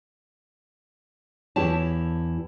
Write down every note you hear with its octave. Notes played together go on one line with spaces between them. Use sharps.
E2 E4 G4 C#5 A5